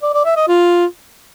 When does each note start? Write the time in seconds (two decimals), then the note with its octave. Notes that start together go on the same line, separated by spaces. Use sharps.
0.02 D5
0.14 D5
0.25 E5
0.36 D#5
0.47 F4